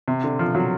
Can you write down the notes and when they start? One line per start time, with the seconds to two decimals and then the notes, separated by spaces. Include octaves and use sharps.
0.08 C3
0.24 D3
0.39 F3
0.55 F#3